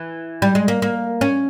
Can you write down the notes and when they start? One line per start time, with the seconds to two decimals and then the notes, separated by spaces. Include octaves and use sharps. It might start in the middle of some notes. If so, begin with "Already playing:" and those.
Already playing: E3
0.42 G3
0.55 G#3
0.68 A#3
0.82 A#3
1.21 C#4